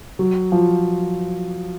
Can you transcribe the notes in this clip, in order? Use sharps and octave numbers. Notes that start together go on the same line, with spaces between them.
F#3
F3